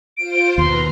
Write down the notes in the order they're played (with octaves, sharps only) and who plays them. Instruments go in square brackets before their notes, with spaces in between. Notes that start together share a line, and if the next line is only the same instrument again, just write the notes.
[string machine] F4 C5 [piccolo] D7
[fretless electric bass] D#2 [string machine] B2 B4 A#5 [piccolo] C6